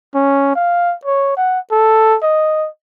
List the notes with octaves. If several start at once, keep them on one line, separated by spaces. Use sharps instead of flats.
C#4
F5
C#5
F#5
A4
D#5